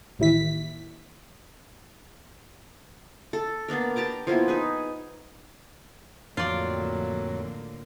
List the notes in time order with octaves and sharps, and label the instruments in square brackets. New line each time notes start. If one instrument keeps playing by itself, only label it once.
[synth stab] A1 D#2 E4 B6
[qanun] A4
A#3 B3 D4 A#4
G4 A5 A#5 D6
F3 A#3 B3 E4
D#4 G#4 B4
[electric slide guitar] F2 [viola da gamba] A2 D3 A#3 [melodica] F#3 [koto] F4 D5